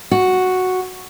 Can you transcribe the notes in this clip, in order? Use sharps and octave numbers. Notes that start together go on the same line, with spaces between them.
F#4